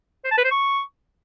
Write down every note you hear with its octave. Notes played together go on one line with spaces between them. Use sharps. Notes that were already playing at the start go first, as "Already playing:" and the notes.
C5
A5
B4
C5
C#6